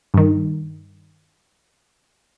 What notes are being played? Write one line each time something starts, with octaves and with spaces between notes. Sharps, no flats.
G2 D#3